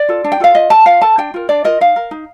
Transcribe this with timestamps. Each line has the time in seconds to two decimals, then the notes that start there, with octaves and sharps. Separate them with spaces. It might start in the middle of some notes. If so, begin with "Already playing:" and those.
Already playing: D5
0.09 F4 A4
0.24 D4
0.32 G5
0.40 F4 A4 F5
0.55 F4 D#5
0.70 A4 A5
0.86 F4 F5
1.02 A4 A5
1.18 D4 G5
1.34 F4 A#4
1.49 D4 D5
1.64 F4 A#4 D#5
1.81 D#4 F5
1.96 A#4
2.11 D#4